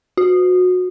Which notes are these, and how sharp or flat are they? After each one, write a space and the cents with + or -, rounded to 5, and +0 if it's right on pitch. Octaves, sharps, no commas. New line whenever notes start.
F#4 -25